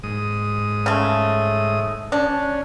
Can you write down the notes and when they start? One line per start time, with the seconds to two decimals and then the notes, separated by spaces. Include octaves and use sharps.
0.03 G#2 D#6
0.86 C#3 A3
2.12 C#4 D4